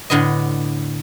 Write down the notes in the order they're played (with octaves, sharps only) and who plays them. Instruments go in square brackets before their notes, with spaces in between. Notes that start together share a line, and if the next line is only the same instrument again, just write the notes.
[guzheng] A2 D3 B3 D#5